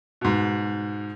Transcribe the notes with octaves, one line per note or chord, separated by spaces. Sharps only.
G#2 B2